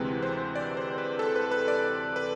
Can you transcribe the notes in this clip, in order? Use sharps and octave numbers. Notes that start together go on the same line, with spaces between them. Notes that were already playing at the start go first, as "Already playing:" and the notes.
Already playing: D2 C3 E3 G#3 C4 B4
C5
D5
C5
B4
A4
B4
B4
D5
B4